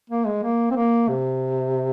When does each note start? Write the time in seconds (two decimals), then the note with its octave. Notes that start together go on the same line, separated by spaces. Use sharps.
0.10 A#3
0.26 G#3
0.43 A#3
0.71 C4
0.76 A#3
1.08 C3